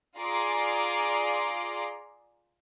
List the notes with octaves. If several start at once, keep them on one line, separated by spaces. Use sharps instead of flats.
F4 G#4 D5 A#5 C6 D6